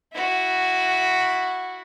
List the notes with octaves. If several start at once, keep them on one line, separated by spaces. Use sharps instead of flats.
E4 F#4